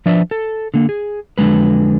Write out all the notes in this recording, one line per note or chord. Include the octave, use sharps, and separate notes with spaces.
F3 D4 B4 D5 E5
A4
D3 A#3
G#4
F2 D3 F#3 G#3 B4